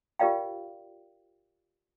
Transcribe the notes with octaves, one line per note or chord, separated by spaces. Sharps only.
F4 G4 A#4 D5 F5 G5